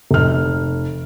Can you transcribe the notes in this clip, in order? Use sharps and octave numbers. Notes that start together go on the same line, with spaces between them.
F1 F6